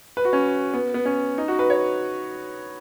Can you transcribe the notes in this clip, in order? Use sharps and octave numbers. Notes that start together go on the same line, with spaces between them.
B4
F#4
C#4
B3
B3
C#4
D#4
F#4
B4
C#5